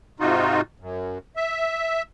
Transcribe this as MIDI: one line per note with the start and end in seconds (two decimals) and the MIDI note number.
0.20 0.61 44
0.20 0.61 48
0.20 0.61 63
0.20 0.61 65
0.20 0.61 66
0.80 1.18 42
1.36 2.02 76